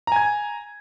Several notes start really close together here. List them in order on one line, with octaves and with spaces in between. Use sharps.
A#5 G#5 G#6